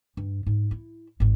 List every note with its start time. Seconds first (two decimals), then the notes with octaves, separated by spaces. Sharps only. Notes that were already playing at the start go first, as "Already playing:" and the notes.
0.17 G2
0.46 G#2
0.71 E4
1.20 G#1 G#2